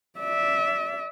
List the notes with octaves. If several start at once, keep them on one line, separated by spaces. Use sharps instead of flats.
D5 E5